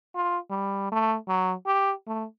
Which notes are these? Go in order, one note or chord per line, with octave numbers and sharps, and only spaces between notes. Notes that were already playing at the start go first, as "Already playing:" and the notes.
F4
G3
A3
F#3
G4
A3